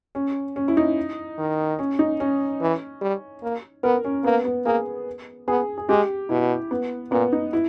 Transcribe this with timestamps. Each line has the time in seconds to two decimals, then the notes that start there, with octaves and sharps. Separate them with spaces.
0.15 C#4
0.56 C#4
0.68 E4
0.77 D#4
1.38 D#3
1.79 C#4
1.99 D#4
2.20 C#4
2.61 E3
3.01 G3
3.43 A#3
3.84 B3 A#4
4.05 C#4
4.24 A#3 B3
4.45 B3
4.65 A#3 G#4
5.48 B3 G#4
5.78 G#4
5.89 G#3 G4
6.29 B2 E4
6.71 B3
7.11 A#2 B3
7.32 D#4
7.53 E4